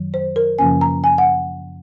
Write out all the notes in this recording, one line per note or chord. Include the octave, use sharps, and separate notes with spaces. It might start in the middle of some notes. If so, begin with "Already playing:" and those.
Already playing: F#2 D#3 F#3
C5
A#4
F#2 C#3 F3 A#3 C#4 G#5
A#5
G#5
F#5